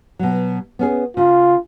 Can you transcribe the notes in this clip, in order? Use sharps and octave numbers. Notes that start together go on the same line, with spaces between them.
B2 F#3
B3 C#4 G#4
C#3 F4